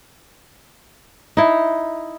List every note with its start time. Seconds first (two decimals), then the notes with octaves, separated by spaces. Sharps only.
1.37 D#4 E4